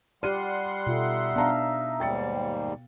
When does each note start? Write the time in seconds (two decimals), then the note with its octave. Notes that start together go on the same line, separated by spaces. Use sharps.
0.23 G3 G4 D5 F#5 C6 F6 D#7
0.87 B2 D#4 F4 A4 E5
1.36 B3 D4 F5 A#5
2.00 D#2 G#2 G3 G5 A6 C#7